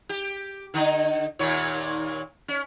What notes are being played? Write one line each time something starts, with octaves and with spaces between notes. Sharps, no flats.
G4
D3 D#4
D#2 A#2 C#5
C#4